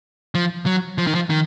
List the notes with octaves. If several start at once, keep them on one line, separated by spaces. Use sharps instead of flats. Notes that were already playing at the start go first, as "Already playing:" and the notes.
F3
F#3
F3
D#3
F3
D#3